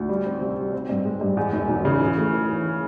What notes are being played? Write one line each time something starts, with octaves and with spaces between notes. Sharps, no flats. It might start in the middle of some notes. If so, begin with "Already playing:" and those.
Already playing: D2
G3
C4
C2
G3
C4
G2
G#3
G2
E2
E1
E1
C#3
E3
A3
E3
E3